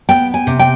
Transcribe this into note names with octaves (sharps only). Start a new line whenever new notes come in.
B3 G5
G#5
C3
G5